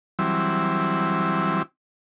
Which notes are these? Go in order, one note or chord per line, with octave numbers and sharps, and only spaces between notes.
E3 F#3 G3 C4 E4